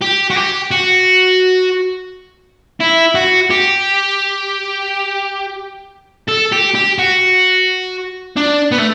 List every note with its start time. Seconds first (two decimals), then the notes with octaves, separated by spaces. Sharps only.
0.01 G4
0.30 F#4
0.36 G4
0.71 F#4
2.80 E4
3.15 F#4
3.50 G4
6.28 A4
6.52 G4
6.75 G4
6.98 F#4
8.37 D4
8.72 B3
8.79 A3